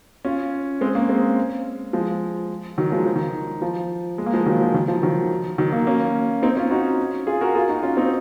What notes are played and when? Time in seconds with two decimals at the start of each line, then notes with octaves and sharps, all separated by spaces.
0.25 C#4 F4
0.81 G#3 C4
0.95 A#3 C#4
1.09 G#3 C4
1.93 F3 G#3
2.78 D#3 F#3
2.92 F3 G#3
3.05 F3
3.15 D#3
3.62 F3
4.18 G#3
4.26 A#3
4.34 F3 G#3
4.46 D#3 F#3
4.61 F3
4.74 D#3
4.88 F3
5.03 D#3 F#3
5.58 D#3 F#3
5.72 F#3 A#3
5.87 A#3 C#4
6.42 C4 D#4
6.57 C#4 F4
6.70 D#4 F#4
7.27 F4 G#4
7.41 F#4 A#4
7.55 F4 G#4
7.69 D#4 F#4
7.83 C#4 F4
7.97 C4 D#4